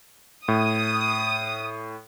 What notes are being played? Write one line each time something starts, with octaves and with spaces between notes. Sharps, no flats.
A2 D#6